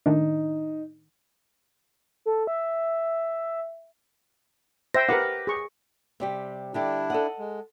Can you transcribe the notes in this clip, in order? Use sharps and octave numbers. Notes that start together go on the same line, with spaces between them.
A2 D#3 D4 D#4
A4
E5
C5 E5 G5 A#6
G4 A#4 B4 F#5
G#4 C#6
C3 G3 G4
D3 G3 D4 E4 G4
A4 D#5 F#5
G#3